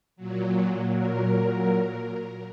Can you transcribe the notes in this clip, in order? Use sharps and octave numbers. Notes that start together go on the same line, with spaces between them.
A#2 F#3
A#4